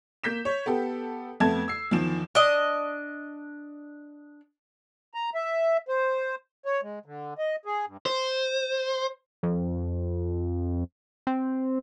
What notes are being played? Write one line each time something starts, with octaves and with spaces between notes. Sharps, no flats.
A#3 G6 B6 E7
C#5
B3 G4 A4
F2 A3 B3 A5 G#6
E6 C7
E2 D#3 F3 E7
D4 D#5
A#5
E5
C5
C#5
G#3
D3
D#5
G#4
G2
C5
F2
C4